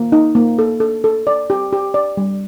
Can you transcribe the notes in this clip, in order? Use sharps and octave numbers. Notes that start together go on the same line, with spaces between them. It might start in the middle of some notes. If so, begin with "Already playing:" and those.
Already playing: A#3
D#4
A#3
A4
A4
A4
D5
G4
G4
D5
G3